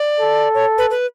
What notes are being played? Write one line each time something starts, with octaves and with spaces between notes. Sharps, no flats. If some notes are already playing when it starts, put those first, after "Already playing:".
Already playing: D5
A4
C#5
B4
B4